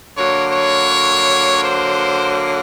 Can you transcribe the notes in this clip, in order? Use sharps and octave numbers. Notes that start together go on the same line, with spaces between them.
D3 F#3 A#3 C#5
C#5
C5